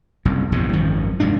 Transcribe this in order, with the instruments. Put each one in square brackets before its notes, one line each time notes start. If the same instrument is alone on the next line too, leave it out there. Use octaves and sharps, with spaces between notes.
[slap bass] F#1 C2 F#2
A#1 E2 G2 C3
G#1 F#2 D#3 F3
F1 D#2 G#2 D4